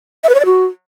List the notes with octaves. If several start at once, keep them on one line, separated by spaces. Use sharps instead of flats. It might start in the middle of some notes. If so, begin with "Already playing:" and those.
E5
B4
C#5
D5
F#4